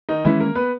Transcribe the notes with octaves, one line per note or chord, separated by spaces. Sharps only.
D#3 D#4
D#3 E3 G#3 C#4 E4
A#3 A#4
B3 B4